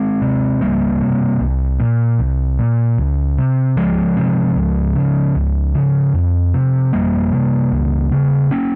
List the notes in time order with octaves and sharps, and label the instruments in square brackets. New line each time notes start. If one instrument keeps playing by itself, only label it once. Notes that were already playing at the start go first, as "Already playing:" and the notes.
Already playing: [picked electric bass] G#3 C4
C3
C#2 G3 A#3
C3
C2
A#2
C2
A#2
C#2
C3
C#2 F3 G#3
C3
C#2
C#3
C#2
C#3
F2
C3
F2 G3 A#3
C3
C#2
C#3
A#3 C#4